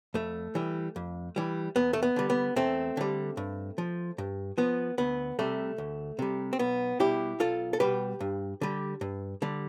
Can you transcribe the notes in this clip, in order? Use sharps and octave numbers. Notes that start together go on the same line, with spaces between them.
F2 A3
E3 G3
F2
E3 G3
E2 B3
A3
B3
D3 G3
B3
E2 A3 C4
D3 G3
G2
F3
G2
F3 B3
D2 B3
C3 G3 A3
D2
C3 G3
C4
B1 B3
B2 G3 E4 G4
B1 F4 A4
A4
B2 G3 G4 B4
G2
D3 G3
G2
D3 G3